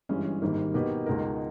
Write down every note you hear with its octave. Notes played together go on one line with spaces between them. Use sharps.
G1 G2 E3 G#3 C#4
G#1 G#2 D#3 G3 A#3
B2 A#3 D#4 G4 B4
C#2 B2 G#3 D#4 A#4